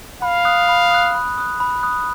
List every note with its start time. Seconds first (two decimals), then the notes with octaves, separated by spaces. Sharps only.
0.22 F5 B5
0.45 D#6 F#6
0.69 B5
0.91 D#6 F#6
1.15 B5
1.38 D#6 F#6
1.60 B5
1.83 D#6 F#6